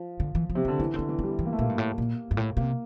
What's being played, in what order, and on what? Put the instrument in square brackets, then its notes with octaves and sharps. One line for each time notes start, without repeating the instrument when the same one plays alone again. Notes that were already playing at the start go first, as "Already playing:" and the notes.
Already playing: [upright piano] F3
[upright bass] D3
E3
F3
[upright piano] C3
[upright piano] D3 [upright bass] D4
[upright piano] E3 [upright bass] E4
[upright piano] D3 [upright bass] C4
[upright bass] D4
[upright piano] E3
[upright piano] G3 [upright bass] C4
[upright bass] E3
[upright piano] A#3
A3
[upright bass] A#2 [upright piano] A#3
[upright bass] G2
A2
A#2
G2
A2
[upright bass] C3 [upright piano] A#3